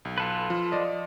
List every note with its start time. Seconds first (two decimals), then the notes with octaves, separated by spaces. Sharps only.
0.05 B1
0.18 F4 A4 B4
0.50 F3
0.72 F3 D5 D#5